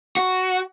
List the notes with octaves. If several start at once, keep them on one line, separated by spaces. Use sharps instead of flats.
F#4